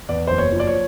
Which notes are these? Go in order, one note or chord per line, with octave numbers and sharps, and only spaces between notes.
E2 D5
F#1 C5
C#5
F3
D5
C#5